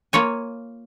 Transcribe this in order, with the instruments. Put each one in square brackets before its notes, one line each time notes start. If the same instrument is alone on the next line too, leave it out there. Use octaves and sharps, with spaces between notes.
[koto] A#3 F4 C#5 G#5